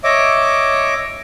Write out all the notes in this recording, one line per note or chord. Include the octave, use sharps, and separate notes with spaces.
C#5 D#5 E5 D6